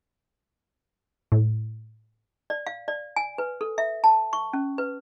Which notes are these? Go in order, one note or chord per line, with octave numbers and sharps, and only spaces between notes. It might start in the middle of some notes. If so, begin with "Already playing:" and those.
A2
D5
F5
D5
G#5
B4
A4
E5
A5
C#6
C#4
B4